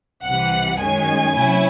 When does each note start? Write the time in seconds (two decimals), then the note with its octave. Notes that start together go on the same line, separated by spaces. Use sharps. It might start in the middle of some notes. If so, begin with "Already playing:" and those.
0.24 C2 C3 E3 F#5
0.79 F#2 D#3 G#3 C#4 G#5
1.35 C3 F#3 A3 C#4 E4